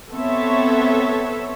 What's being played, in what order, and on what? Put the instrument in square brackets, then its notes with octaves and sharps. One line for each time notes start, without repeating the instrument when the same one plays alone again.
[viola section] B3 C4 A4 C#5 E5